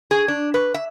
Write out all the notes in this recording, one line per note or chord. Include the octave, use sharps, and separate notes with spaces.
G#4
D4
B4
E5